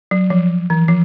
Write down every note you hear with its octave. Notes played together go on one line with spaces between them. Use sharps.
F#3
F3
E3
F3